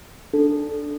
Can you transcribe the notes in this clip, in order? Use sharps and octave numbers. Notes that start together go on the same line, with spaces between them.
D4 A4